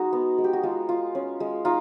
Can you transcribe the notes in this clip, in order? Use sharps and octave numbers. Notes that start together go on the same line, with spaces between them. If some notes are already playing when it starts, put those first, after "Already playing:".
Already playing: G#3 D#4 F#4
B3
G#3
G4
F#4
G#3 F4
F4
C#4
G#3
D#4 F4